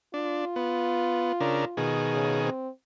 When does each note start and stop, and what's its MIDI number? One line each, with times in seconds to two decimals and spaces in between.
0.14 0.45 62
0.14 2.00 65
0.56 1.32 59
1.40 1.65 49
1.40 1.65 62
1.40 1.65 70
1.77 2.50 47
1.77 2.50 51
1.77 2.50 68
2.13 2.40 49
2.44 2.69 60